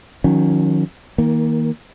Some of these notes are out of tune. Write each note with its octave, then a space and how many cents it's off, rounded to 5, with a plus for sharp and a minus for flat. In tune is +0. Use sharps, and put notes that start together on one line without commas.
D#3 +0 F#3 -40 C#4 +0
D#3 +30 A#3 +0